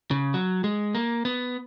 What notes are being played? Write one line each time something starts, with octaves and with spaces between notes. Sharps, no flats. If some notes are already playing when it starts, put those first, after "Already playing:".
C#3
F#3
G#3
A#3
B3